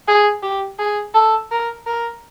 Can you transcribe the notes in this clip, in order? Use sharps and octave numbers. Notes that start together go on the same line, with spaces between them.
G#4
G4
G#4
A4
A#4
A#4